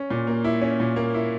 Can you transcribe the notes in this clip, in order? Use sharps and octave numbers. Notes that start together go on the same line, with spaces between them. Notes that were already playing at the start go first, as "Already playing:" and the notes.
Already playing: C#4
A#2
A#3
E4
C#4
A#2
A#3
E4